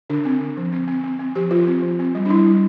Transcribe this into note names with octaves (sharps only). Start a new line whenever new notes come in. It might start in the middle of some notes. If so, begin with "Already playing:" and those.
D3 D4
C4
D3
F3
C4
C4
C4
C4
F3 G4
F3 F4
C4
F3
C4
G3
D4
G3 E4
G3